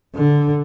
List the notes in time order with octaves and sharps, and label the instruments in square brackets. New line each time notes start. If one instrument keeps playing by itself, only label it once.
[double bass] D3